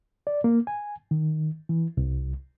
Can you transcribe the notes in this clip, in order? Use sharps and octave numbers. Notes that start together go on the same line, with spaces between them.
D5
A#3
G#5
D#3
E3
C2